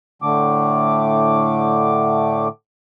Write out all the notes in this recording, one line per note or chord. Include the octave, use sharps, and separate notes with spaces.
A2 D3 A3 D6